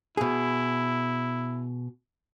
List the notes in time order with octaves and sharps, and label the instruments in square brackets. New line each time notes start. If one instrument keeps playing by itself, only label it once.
[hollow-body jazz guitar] B2 G#4 [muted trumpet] E4